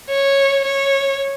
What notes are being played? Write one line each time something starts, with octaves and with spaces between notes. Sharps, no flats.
C#5
C#5